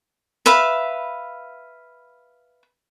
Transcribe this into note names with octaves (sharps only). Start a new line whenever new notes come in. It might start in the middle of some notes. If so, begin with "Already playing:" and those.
B4 E5 F5 B5